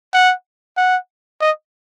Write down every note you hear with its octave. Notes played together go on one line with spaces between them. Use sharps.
F#5
F#5
D#5